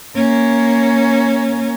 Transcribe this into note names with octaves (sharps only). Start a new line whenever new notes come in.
A#3 C#4